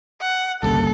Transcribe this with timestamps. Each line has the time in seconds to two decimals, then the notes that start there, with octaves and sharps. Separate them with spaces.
0.21 F#5
0.63 G1 C2 C#3 G3 A#3 A4